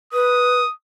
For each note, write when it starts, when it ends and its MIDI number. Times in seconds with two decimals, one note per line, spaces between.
0.13 0.61 71
0.13 0.72 87